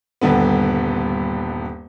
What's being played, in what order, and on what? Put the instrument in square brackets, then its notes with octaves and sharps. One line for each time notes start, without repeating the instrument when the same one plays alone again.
[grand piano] D#1 G2 D3 B3